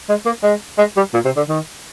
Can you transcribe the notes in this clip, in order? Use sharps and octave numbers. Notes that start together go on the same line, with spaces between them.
G#3
A#3
G#3
G#3
G3
A#2
C3
D3
D#3